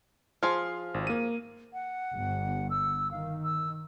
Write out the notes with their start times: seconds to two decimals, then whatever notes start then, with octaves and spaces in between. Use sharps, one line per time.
0.43 F3 G#4 C6 F6
0.94 G#1
1.07 A#3 D#7
1.73 F#5
2.15 G1
2.70 E6
3.11 D#3 F5
3.44 E6